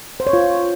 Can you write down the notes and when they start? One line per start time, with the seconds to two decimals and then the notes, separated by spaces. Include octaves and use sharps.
0.20 C5
0.27 C#5
0.33 F4